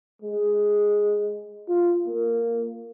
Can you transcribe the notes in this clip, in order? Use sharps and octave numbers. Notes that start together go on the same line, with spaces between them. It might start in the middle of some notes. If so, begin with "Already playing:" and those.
G#3
F4
A#3